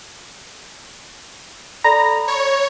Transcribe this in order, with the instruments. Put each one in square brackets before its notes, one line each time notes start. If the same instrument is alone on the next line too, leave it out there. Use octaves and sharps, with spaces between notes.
[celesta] A4 D5 B5 [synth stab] A#5
[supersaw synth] C#5